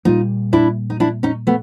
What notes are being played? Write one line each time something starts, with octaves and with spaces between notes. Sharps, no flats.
A#2 G3 A#3 D#4 F4
D4 E4
D#4
D4 E4
C#4 D#4
A3 B3